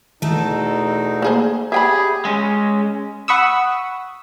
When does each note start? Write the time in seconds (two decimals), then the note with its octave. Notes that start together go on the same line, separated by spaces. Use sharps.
0.22 E2 B2 A3 D#4 A4
1.22 A#3 G#4 C5
1.72 G4 G#4 E5 G5 B5
2.25 G#3 C#4
3.28 F#5 B5 C#6 D#6 E6